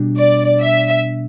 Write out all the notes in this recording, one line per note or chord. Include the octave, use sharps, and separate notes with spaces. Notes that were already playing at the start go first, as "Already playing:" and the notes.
Already playing: B2 G3 D4
D5
E5